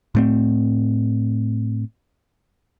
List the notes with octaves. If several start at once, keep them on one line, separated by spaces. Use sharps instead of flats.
A2 A3 C4